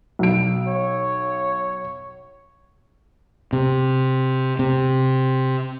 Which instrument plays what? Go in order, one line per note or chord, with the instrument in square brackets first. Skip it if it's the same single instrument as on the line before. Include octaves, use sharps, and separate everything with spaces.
[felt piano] B1 D7
[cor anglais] C#5
[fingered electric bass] C3
C3